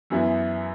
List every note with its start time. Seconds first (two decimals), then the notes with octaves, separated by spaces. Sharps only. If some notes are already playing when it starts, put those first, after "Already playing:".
0.10 F#2 E3 B3 E4